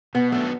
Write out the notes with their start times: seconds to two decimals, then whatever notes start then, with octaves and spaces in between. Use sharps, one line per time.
0.15 B2 B3
0.32 F#3 A3 B3 D4